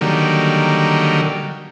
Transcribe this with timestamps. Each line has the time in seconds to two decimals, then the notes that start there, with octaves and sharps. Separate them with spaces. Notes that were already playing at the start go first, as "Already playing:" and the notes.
0.01 D3 D#3 F#3 G3 A#3